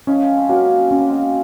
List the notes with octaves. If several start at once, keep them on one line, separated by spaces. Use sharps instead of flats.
F3 G#3 C#4
C4
F#3 A#3 F#4
C4 C#4
A#3
G#3 C4